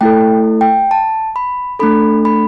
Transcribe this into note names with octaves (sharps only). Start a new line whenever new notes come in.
A3 E4 A4 G5
G5
A5
B5
A3 D4 A4 B5
B5